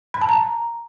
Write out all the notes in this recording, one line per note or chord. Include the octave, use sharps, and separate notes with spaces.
B5
A5
A#5